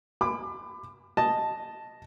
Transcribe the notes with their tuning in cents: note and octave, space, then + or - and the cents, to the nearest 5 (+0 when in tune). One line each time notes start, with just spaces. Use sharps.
B5 +25 D6 +25
D#5 +0 A5 +0